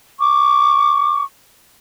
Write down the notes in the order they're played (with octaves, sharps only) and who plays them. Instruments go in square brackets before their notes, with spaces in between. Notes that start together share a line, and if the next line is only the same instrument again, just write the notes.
[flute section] C#6 D6